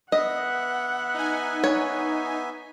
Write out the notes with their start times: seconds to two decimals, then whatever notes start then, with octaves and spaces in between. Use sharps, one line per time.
0.12 B3 D#5 E5 F#5
1.14 D#4 G#5
1.64 C#5